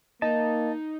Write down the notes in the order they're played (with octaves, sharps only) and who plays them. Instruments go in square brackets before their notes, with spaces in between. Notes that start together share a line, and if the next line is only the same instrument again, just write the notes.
[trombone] A#3 [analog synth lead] D#4 [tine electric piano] D#5 [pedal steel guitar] A5